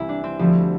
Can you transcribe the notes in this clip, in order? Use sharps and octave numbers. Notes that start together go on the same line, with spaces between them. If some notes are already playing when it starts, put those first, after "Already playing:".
Already playing: C2 C3 E3 E4
D4
C4
D2 D3 F3 G3